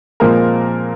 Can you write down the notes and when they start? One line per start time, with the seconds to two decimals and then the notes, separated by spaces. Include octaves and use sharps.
0.20 A#2 F3 G#3 A#3 C4 A#4